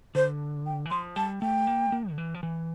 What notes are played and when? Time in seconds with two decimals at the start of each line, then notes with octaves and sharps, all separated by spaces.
0.15 D3 C5
0.66 G5
0.86 E3
0.90 F3 C6
1.16 G3 A5
1.41 A3 G5
1.67 A#3
1.86 A3
1.92 A#3
2.11 D3
2.18 E3
2.35 F3
2.43 E3